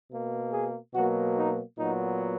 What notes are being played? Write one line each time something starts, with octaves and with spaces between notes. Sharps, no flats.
B2 A#3
G#4
B2 F#3 A#3 F#4
D#4
A#2 F#3 B3 D#4